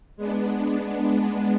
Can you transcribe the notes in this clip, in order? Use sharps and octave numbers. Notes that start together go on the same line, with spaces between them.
G#3 B3 D4